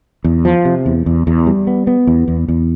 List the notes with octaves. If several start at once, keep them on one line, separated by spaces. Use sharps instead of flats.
E2
F3
C3
E2
E2
E2
G3
B3
B3
E2
E2
E2